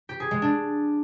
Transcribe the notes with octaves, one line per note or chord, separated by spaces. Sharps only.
G4
G#4
G#3
D4